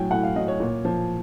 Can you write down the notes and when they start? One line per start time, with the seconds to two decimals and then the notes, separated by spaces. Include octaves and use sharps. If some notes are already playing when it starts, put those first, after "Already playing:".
Already playing: A2 F#3 G5 G#5
0.11 A2 F#5
0.23 F5
0.36 F#3 D#5
0.48 C#5
0.60 A#2
0.85 F3